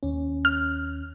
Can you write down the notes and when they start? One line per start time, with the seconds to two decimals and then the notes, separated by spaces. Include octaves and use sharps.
0.03 D#2 C#4
0.45 F6